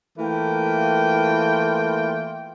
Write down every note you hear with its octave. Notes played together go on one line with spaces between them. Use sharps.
E3 A3 A#3 F4 G5